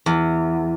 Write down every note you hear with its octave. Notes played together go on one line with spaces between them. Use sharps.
E2